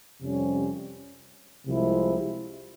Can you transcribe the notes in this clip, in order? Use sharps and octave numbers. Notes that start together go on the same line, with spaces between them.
F2 C3 G3 C#4
C2 C3 F3 G#3 E4